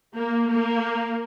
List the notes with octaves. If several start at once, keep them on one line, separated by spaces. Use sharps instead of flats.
A#3
A#3